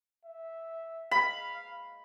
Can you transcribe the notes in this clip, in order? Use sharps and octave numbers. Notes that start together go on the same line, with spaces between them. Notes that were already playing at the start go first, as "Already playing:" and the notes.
E5
F5 B5